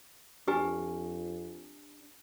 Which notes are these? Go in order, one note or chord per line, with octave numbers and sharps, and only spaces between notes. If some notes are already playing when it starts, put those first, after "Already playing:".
F2 D4 G4 B4 G#5